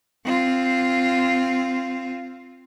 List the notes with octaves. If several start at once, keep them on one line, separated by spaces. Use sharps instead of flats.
C4 F4